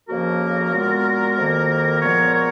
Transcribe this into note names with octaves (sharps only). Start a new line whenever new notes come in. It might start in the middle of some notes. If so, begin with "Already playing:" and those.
F2 C#3 F3 A#3 F#4 A#4
A#2 G#3 B3
F2 D#3 A#3
A#2 F3 G#3 B3 A#4 C#5
A#4 C#5